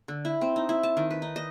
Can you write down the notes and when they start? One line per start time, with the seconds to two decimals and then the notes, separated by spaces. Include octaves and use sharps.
0.08 D3
0.25 E4
0.41 C4
0.56 D#4
0.69 E4
0.83 A5
0.97 D#3
1.11 B4
1.22 D#4
1.36 D#5